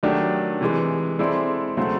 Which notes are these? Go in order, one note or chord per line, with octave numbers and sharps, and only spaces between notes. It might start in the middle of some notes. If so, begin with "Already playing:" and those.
D#3 F#3 A3 D4 G4
C3 E3 G#3
G#3 C4 E4 A4 D5
C#3 F#3 A3 C4